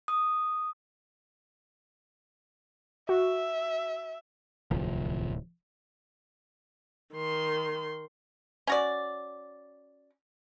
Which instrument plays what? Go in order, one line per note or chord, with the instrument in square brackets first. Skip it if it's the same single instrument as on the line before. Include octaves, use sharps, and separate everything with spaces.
[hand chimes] D#6
[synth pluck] F#4 [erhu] E5
[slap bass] D1 C3 [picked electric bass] C2 F3
[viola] D#3 C6
[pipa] C#4 F#4 D5